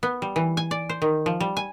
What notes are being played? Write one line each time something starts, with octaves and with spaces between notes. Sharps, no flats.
B3
G3
E3
G#5
D5
C5
D#3
F3
G3
G#5